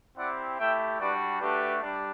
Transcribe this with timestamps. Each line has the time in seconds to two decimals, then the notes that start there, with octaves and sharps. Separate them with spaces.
0.17 C4 E4 G4 D5 F#5
0.59 A3 E4 G4 E5 G5
1.00 G3 D4 F#4 B4 D5
1.41 A3 D4 F#4 G4 B4
1.83 G3 D4